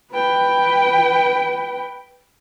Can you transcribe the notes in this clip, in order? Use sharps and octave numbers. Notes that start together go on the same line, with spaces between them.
B4 G5